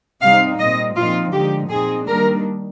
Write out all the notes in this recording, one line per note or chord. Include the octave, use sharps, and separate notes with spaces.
C3 G3 C4 D#4 F5
A#2 G3 C4 D#5
A#2 F3 C4 D#4 F4
D3 F3 G#3 D#4 G4
A#2 F3 C4 D#4 G#4
D#3 G3 A#3 D4 A#4